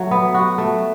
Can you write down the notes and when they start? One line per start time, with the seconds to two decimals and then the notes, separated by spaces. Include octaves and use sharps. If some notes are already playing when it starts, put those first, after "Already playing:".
Already playing: F#3 A3
0.11 B3
0.34 F#4
0.58 A3